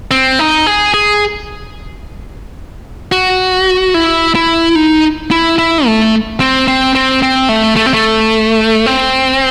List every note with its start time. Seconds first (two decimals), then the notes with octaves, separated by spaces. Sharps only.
0.11 C4
0.39 D#4
0.67 G#4
0.94 G#4
3.12 F#4
3.94 E4
4.35 E4
4.75 D#4
5.31 E4
5.58 E4
5.86 A3
6.40 C4
6.68 C4
6.95 C4
7.23 C4
7.49 A3
7.76 A3
7.86 C4
7.94 A3
8.86 C4